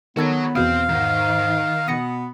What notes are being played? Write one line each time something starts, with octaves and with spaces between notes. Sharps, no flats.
D#3 B3 F#4 A4 C#5 G#6
E2 B2 C4 F5 D#6
G#2 D#3
B2 B3 D#6 A#6 C#7